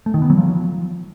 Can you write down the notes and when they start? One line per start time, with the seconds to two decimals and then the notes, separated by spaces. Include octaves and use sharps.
0.06 A3
0.14 D#3
0.22 B3
0.30 F#3
0.38 F3